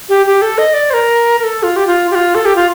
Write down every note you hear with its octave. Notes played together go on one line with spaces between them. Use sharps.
G4
G4
A4
D#5
D5
C5
A#4
A#4
A4
F4
G4
F4
G4
F4
A4
G4
F4